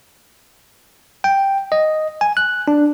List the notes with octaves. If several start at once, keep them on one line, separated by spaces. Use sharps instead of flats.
G5
D#5
G#5
F#6
D4